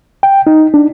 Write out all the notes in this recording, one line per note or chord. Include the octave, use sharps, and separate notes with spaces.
G5
D#4
D4